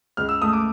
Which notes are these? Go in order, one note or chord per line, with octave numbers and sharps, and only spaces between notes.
C#2 F6
E6
A3 D#6
D6